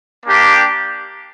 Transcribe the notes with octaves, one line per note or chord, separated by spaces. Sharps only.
A#3 D4 G4